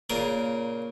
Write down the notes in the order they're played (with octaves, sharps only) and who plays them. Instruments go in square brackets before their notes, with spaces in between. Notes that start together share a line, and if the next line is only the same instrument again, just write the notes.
[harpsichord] A#2 C#3 A#4